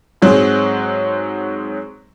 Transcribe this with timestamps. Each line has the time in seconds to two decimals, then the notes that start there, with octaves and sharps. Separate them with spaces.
0.22 G#2 F#3 G#3 C4